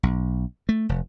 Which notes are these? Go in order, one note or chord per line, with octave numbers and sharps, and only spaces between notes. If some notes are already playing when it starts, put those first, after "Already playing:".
B1
A3
F1